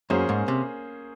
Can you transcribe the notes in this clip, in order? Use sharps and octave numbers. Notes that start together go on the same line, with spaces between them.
F#2 A#3 C#4 G#4 C5
G#2
C3